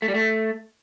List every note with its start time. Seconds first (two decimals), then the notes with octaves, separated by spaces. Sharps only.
0.02 A3
0.08 G3
0.14 A3